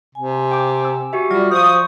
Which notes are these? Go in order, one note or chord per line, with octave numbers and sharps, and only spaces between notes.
C3 G#5
G5 D6
E6
F#4 G4 E5
F#3 G3 F4 D5
F3 C5 F5 C#6 D#6